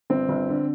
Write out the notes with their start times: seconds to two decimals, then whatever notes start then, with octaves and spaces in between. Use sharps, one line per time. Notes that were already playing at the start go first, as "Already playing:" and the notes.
0.10 G1 C4
0.29 G1
0.49 D3